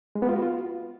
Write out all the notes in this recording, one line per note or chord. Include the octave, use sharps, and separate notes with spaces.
G#3
B3
F4
F#4
F4